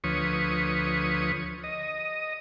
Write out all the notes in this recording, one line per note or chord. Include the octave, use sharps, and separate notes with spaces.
D2 F3 B4 C#5 C#6 D#6
D#5